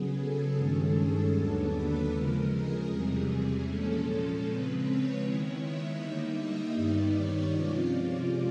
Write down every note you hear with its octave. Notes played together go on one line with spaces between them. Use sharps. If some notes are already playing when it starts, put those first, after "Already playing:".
Already playing: C#3 F#3 B3 G#4
A4
G2 D#3 G#3 C#4
G#4
D#2 D3 F#3 B3 D4 A4
B4
C#3 F3 G#3 A#4
G#4
E2 C3 E3 G3
A#2 F3 G#3 C#4 A4
C#3 F3 G#3 C4 B4
C#5
D#3 G#3 B3 E4 C#5
E5
D3 G3 A#3 D#4
D#5
G2 D#3 G3 B3 D#4 D5
C#5
C3 F3 G#3 C#4 F4 D5
D5